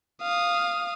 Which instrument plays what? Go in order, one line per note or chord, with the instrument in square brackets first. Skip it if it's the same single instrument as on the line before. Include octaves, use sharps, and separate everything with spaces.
[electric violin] F5 D#6